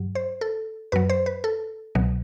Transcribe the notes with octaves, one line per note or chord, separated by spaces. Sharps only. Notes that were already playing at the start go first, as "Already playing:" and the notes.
Already playing: G2 F#3
C5
A4
F#2 F#3 B4
C5
B4
A4
C2 B2 F#3